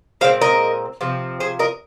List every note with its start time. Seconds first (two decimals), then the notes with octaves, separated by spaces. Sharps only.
0.21 A#2 G#3 C4 C5 F5
0.42 A#4 D#5
1.01 C3 F3 C4
1.40 G#4 C5
1.59 A#4 D#5